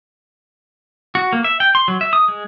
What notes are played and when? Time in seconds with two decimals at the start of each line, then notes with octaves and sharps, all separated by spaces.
1.15 F#4
1.33 A#3
1.44 E5
1.60 G5
1.75 C6
1.88 F#3
2.01 E5
2.13 D#6
2.28 G#3